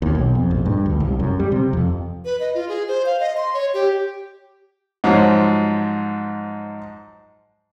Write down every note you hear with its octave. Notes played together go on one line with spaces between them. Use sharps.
D#2
B1
F2
A#1
G2
D2
C2
F#2
G3
C3
F2
B4
D#5
F4
G#4
C5
F5
D#5
C6
C#5
G4
G#2 F3 F#3